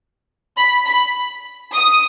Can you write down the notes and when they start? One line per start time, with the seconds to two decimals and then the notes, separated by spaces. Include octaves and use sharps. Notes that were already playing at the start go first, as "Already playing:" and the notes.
0.57 B5
0.86 B5
1.74 D#6